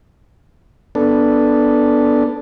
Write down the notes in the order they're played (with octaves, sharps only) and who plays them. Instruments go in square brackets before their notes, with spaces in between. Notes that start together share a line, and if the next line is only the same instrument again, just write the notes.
[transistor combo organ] B3 D4 A4